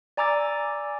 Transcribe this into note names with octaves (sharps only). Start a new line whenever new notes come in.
D5 G#5 A#5 D6 E6 A6